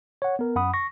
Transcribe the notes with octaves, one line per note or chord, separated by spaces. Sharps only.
C#5 F#5
B3 A#4
F#2 F#5 B5 D#6
C#6 A#6